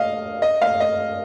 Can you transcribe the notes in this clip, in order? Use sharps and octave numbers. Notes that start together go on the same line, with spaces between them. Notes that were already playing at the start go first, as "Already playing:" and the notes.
Already playing: D#5 F5
D#5
F5
D#5